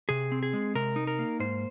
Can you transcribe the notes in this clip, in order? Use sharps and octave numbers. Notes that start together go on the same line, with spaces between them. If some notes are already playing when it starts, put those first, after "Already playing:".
C3 G#4
C4
G#4
G#3
C3 A#4
D#4
A#4
A#3
G#2 C5